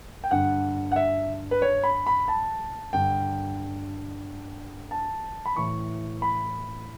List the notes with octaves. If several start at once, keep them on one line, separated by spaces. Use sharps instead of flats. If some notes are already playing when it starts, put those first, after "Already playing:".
G5
G2 D3 F#5
F#5
E5
B4
C#5
B5
B5
A5
G2 D3 G5
A5
B5
A2 E3 C#6
B5